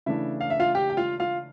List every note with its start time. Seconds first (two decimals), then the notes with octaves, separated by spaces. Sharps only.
0.06 C#3 E3 A3 D4 E4 E5
0.41 F5
0.50 E5
0.60 F4 F5
0.75 G4 G5
0.90 G5
0.97 F4 F5
1.20 F4 F5